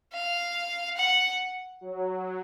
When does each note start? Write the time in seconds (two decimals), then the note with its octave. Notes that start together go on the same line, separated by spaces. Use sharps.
0.13 F5
0.97 F#5
1.81 F#3